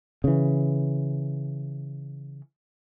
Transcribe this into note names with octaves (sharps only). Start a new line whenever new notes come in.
C#3 E3